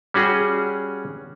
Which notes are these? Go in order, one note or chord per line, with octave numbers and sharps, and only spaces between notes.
G3 C#4 F#4 G#4